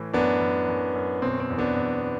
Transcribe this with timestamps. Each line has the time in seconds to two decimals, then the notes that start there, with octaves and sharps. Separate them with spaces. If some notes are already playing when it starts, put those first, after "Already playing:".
Already playing: A2 E3
0.13 F#2 B3 D4
0.41 F#2
0.69 F#2
0.96 F#2
1.22 B2 C4
1.40 C4
1.50 E2
1.58 B3 D4
1.76 E2
2.03 B2